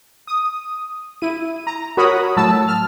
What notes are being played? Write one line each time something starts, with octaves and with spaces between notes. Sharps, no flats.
D#6
E4 D#7
A#5
F#4 A#4 C#5 B5 D#6
A2 F#3 A5 E6
F6